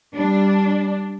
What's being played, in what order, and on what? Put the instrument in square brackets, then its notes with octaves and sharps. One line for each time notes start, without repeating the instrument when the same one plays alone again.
[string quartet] G3 [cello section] D4